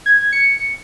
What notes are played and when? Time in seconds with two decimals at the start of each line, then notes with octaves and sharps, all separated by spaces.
0.06 G#6
0.32 C#7